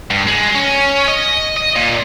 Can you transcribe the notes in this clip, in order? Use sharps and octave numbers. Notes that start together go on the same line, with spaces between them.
G2
G#3
C#4
D#5
D#5
A#2